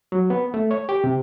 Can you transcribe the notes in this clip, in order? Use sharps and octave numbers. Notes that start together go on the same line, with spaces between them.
F#3
B3
A3
C#5
G4
C3